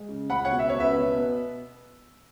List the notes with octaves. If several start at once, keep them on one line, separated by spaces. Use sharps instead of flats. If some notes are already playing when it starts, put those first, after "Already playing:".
Already playing: G#3
C#3
C#2 F#5 B5
C#5 F#5
B2
E5
C#2 C#5
B4 E5
B2
B3